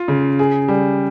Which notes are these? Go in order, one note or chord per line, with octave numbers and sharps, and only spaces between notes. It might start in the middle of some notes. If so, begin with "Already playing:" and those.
Already playing: F4
C#3
G#4
G3